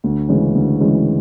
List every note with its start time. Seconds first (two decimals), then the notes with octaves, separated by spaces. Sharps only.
0.04 D2
0.28 C#3 E3 G#3 C#4
0.55 D2
0.80 C#3 E3 G#3 C#4